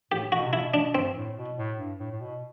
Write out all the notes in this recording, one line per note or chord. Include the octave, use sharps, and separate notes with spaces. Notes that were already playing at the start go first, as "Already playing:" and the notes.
A2 G4
B2 F#4
C3
B2 E4
B2 D4
G2 C4
A2
B2
A2
G2
A2
A2
B2